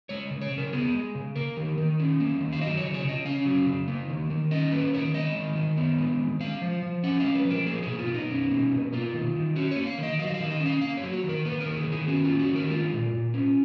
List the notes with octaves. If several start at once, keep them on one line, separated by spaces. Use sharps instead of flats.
G#3 C#5
C#3
C#5
C#3
A#4
B3 G#4
G#3
C#3
A#3 A#4
D#3
D#3
C#4
A#3
D#3
F5
F#3 D#5
C#5
C#3
C#5
C#3 D#5
C#4 F5
F#3
C#3
A#3
D#3
D#3
C#4 D#5
A#3 B4
D#3 C#5
G#3 D#5
D#3
D#3
B3
G#3
D#3
G#3 F5
F3
F3
C#4 F#5
G#3 F5
B4
F3
A#4
A#3 G#4
B2 G#4
F4
B2
D#4
C#4
A#3
B2
A#3 F4
D#3
D#3
C#4 F#4
A#3 C#5
F5
D#3
D#5
F#3 F5
D#5
F5
D#3
D#5
C#4
F5
A#3 F5
C#5
F#3
F#4
D#3
A#4
A#3 B4
D#3 A#4
G#4
D#3 G#4
C#4 F#4
A#3 F4
F#4
D#3
A#4
G#3 F4
A#2
A#2
C#4